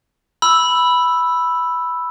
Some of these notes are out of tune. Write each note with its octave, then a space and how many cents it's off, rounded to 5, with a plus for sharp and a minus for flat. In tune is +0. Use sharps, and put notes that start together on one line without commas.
B5 +0 E6 +0